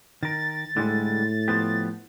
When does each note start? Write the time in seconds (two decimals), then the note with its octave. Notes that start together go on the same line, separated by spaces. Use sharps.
0.23 D#3 A#4 A6
0.77 A2 D3 G3 G#3
1.48 F3 B3 G4